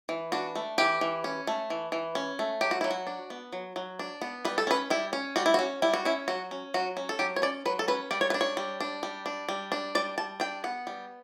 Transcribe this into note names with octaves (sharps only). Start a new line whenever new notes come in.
E3
D4 F#4
A3
E3 G4
E3
C#4
A3
E3
E3
C#4
A3
F#3 G4
F#4
F#3 E4
F#4
D4
B3
F#3
F#3
D4
B3
G3 B4
A4
C#4 B4
G3 E4
C#4
G3 F#4
E4
F#4
C#4
G3 E4
F#4
C#4 E4
F#3 F#4
C#4
F#3 F#4
C#4
A4
F#3 G4
C#5
C#4 D5
F#3 B4
A4
C#4 B4
G3 D5
C#5
B4
D4
C#5
G3
D4
G3
D4
G3
D4
G3 D5
G3 A5
D4 G5
B3 F#5
G3